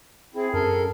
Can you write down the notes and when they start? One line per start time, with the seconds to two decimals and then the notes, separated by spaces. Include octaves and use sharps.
0.35 C4 E4 G#4
0.53 F#2 A4 A#4